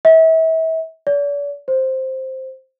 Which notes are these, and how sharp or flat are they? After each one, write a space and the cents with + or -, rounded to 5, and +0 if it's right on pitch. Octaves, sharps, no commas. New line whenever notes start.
E5 -35
D5 -40
C5 +5